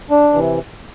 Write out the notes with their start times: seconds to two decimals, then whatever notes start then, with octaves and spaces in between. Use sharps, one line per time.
0.11 D4
0.34 C3 E3